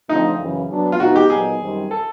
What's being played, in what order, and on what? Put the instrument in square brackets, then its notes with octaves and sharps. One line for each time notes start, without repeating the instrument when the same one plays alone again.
[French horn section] D3 F3 A3 C4 F4 [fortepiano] D#4
[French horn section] F#2 C#3 E3
F#3 B3 D4
[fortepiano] F4
[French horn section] B2 G#3 B3 D#4 [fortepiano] F#4
[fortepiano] G4
[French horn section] A#2 F#3 B3 D#4 [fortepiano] G#4
[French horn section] F#2 D#3 G3 C4
[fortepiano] A4